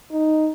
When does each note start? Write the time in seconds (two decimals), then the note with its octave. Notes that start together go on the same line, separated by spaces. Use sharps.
0.11 D#4